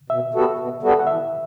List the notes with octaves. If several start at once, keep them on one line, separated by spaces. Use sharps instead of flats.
B2 E5
G3 B3 F#4 A4
B2
G3 B3 F#4 A4
F#5
E3 E5